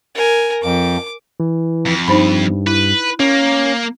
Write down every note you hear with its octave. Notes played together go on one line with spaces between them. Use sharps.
A#4 G#5
F2 D6
E3
F2
G2 D#4 C5 B5
E4 B4
A#3 C#4